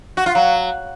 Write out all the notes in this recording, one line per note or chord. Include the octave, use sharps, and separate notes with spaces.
F#4
F4
F#3